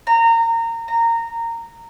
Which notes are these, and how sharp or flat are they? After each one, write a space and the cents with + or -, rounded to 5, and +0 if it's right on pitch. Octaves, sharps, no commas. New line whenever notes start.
A#5 -25
A#5 -15